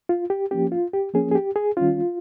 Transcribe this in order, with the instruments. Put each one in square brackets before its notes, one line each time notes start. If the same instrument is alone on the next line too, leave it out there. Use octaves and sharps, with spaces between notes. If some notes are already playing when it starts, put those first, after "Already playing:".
[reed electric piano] F4
G4
F3 A#3 C#4 G4
F4
G4
F3 A#3 C#4 G#4
G#4
G4
G#4
D#3 G3 C#4 F4